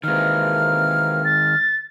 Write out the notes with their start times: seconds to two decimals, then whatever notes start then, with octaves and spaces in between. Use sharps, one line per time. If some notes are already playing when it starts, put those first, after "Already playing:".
0.04 C3 D#3 E3 G#3 A#3 F6
1.25 A6